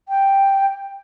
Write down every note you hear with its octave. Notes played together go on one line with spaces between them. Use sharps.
G5